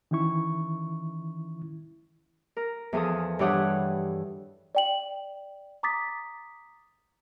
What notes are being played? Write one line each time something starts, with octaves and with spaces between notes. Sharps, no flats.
D#3 E3 C#4 E4 C#6
A#4
E2 F3 G#4 A4 D#6
G2 E3 G4 C#5 F#5 D#6
D5 G5 F#7
A#5 D6 D#6 A6 B6